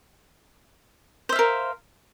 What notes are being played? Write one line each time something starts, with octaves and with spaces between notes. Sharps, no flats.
A#4 C5 E5 F5